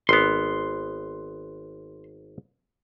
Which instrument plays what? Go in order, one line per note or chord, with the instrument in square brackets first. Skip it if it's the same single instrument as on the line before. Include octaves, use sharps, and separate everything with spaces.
[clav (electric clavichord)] G#1 B3 [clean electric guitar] C6